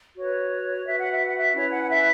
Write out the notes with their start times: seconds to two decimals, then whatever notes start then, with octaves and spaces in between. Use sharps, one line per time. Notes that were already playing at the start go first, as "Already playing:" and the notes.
0.16 F#4 B4 C#5
0.85 F#4 B4 E5
0.98 F#5
1.11 E5
1.24 F#5
1.37 E5
1.54 C#4 E4 B4 C#5
1.71 F#5
1.83 F#5
1.88 E5